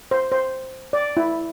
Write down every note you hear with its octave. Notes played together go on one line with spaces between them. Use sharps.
C5
C5
D5
E4